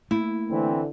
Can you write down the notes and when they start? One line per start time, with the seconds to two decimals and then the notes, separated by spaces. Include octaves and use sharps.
0.11 A3 A#3 E4
0.50 D3 E3 C4